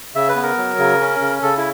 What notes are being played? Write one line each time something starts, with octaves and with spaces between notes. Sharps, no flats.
C#3 E5
B4
B3
A#4
F#3
C#3
C#4
C#3
C#3 A4
E4